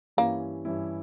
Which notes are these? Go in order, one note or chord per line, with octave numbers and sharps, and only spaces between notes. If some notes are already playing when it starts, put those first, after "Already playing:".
G2 E3 G3 A#3 C#4 E4
G2 E3 G3 C#4 E4